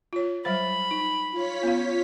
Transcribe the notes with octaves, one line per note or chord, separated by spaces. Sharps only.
F4 C#5
F#3 G3 C5 B5
D#4
F4 C#5 B6
B3 C#4 F5